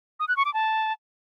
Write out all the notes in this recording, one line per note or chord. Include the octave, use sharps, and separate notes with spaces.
D#6
F#6
C#6
D6
A5